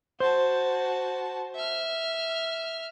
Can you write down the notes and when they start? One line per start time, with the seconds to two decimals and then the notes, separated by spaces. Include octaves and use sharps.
0.20 F#4 C5 A5
1.55 E5 F6